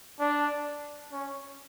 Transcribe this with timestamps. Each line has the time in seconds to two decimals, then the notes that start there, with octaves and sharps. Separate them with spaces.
0.20 D4
1.12 C#4